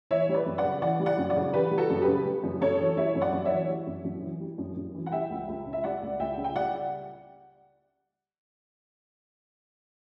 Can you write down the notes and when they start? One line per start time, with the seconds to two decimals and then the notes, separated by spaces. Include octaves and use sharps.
0.11 E3 C#5 E5
0.29 G3
0.34 B4 D5
0.46 F#2
0.58 D5 F#5
0.65 C#3
0.82 E3 D5 F#5
1.00 G3
1.06 D5 F#5
1.18 F#2
1.30 D5 F#5
1.36 C#3
1.54 E3 G4 B4
1.71 G3
1.78 F#4 A4
1.90 F#2
2.02 G4 B4
2.08 C#3
2.26 G3
2.44 F#2
2.61 F#2 A4 C#5
2.80 E3
2.97 G3 C#5 E5
3.15 F#2
3.21 D5 F#5
3.33 F#2
3.45 C#5 E5
3.51 E3
3.69 G3
3.87 F#2
4.05 F#2
4.22 E3
4.40 G3
4.58 F#2
4.76 F#2
4.94 E3
5.06 F#5
5.12 G3 E5 G5
5.30 C#2
5.48 C#2
5.67 C#3
5.73 E5
5.84 G3 D5 F#5
6.03 C#2
6.20 C#2 E5 G5
6.37 C#3
6.44 G5
6.55 G3 D5 F#5